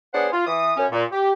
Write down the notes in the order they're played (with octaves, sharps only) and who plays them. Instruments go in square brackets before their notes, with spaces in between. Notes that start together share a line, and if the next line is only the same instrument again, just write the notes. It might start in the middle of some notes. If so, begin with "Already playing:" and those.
[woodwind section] B3 D4 G#4 C5 C#5 F#5
F4
E3 D#6
F#2 C#4
A#2
G4